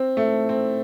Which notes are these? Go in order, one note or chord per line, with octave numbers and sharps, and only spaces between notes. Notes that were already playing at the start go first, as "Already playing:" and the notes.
Already playing: C4
A3
C4